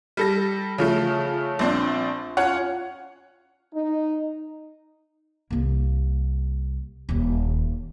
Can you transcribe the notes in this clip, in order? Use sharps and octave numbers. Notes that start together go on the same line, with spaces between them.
G3 A4 A#6
C#3 F3 A3
A#1 C4 D4
C#4 F4 C#5 F#5
D#4
C2 A#3
D#1 D#2